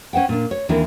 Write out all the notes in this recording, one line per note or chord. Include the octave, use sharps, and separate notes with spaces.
C#4 C5 F#5 G5
A#2 D4
C#5
D#2 E3 C4 D4 E4 A#4